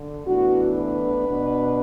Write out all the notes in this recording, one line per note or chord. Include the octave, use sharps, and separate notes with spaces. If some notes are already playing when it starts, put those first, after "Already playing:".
Already playing: D3
A2 E3 B3 D4 F#4
B4
B2 B3 D4